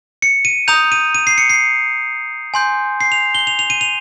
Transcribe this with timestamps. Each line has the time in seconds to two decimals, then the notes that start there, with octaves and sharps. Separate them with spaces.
0.22 C#7
0.45 D#7
0.68 A#5 D#6 G6 F7
0.92 D#7
1.15 D#7
1.27 C7
1.38 C#7
1.50 C7
2.54 G#5 C6 G6
3.01 C7
3.12 F7
3.35 G7
3.47 F7
3.59 F7
3.70 D#7
3.81 F7